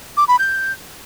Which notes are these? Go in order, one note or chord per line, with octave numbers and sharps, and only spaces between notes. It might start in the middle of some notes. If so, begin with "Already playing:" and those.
D6
B5
G6